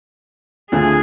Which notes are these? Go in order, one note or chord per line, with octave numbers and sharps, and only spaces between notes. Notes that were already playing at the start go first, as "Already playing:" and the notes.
D2 D3 F3 A3 G#4